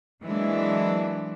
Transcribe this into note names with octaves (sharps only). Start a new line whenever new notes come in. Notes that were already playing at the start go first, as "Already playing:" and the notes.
E3 F#3 G#3 A#3 D4 E4